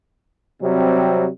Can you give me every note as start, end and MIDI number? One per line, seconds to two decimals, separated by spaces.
0.62 1.28 48
0.62 1.28 54
0.62 1.28 55
0.62 1.28 60